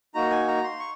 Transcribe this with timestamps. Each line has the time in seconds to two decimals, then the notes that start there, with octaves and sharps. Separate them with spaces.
0.15 A#3 D#4 F#4 A#5
0.31 G#5
0.48 A#5
0.64 C6
0.79 C#6